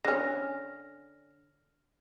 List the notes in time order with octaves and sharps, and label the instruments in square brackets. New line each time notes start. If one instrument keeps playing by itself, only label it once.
[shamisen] D3 C#4 [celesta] F6 A#6